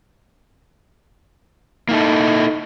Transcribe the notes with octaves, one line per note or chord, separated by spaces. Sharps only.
A#3 D#4 E4 A4